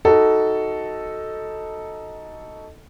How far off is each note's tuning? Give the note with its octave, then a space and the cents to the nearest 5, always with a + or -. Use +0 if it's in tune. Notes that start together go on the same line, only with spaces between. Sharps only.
D#4 +10 F#4 +15 A4 +0